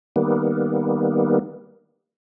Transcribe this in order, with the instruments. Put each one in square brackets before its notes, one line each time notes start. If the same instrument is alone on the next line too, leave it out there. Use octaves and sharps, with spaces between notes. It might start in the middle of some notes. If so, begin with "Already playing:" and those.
[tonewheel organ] D#3 G3 A#3 B3